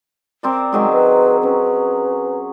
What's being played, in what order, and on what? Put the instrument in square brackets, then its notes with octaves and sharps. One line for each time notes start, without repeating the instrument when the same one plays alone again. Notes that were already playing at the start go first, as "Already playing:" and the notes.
[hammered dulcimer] C4 A#4 D5
[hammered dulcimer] D#3 F#3 G#4 [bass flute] G#3
[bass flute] B4
[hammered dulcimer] C#4 [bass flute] B4